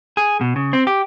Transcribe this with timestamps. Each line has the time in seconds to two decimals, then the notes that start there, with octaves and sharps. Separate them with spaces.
0.17 G#4
0.41 B2
0.56 C#3
0.73 C4
0.87 G4